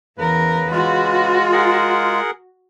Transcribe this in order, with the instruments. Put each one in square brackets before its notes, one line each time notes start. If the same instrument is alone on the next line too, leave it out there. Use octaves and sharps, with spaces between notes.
[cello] E2 A#4 [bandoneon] C#3 B4
[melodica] G#3 F4 [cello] F#4
[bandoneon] G#4 A#4 F#5